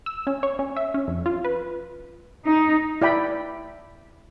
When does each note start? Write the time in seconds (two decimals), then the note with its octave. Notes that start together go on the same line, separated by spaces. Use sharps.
0.06 E6
0.27 C#4
0.43 C#5
0.59 C#4
0.77 E5
0.94 C#4
1.08 F2
1.26 F4
1.45 B4
2.44 D#4
3.01 E4 D5 G5 B5